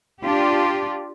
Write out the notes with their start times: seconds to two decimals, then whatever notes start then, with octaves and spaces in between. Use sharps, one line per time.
0.23 D4 F4 G4